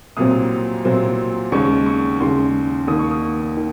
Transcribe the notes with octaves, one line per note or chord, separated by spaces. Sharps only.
C2 A#2 F#3 C4 D#6
C2 A#2 F#3 C4
D#2 C#3 G#3 C#6
C#6
D#2 C#3 G#3 C6
D#2 D#3 A#3 D#6
C#6
D#6
D#3